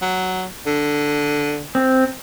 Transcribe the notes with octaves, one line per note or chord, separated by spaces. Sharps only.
F#3
D3
C4